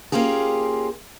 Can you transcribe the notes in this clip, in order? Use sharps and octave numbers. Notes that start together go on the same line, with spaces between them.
A#3 C#4 F4 G4 G#4